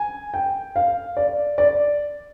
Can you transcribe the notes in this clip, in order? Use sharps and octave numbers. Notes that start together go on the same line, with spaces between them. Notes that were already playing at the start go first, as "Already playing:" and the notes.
Already playing: G#5
G5
F5
D5
D5